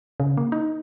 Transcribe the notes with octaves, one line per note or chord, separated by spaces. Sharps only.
C#3
A#3
D#4